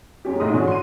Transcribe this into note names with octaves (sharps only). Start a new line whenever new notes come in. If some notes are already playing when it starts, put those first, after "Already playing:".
F#2 G#3 C#4 G4
A#1 A3 D#4 C6 D#6
G#2 D3 E3 C#4 D4 F#4
C6 D#7